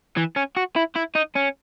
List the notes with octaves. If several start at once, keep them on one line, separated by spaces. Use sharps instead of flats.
E3
C#4
F#4
E4
E4
D#4
C#4